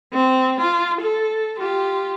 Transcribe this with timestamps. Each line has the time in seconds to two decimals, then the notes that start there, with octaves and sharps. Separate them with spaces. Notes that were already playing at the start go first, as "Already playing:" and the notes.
0.13 C4
0.61 F4
1.01 A4
1.57 F4 G4